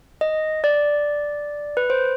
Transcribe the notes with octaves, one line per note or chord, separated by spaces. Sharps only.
D#5
D5
B4
C5